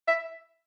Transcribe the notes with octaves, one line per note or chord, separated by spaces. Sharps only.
E5